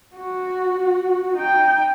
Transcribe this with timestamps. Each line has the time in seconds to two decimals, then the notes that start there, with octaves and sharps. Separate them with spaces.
0.16 F#4
1.36 D#4 G5